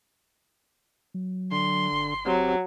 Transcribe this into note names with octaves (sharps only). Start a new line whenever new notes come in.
F#3
D3 C6
G1
F#3 C4 G4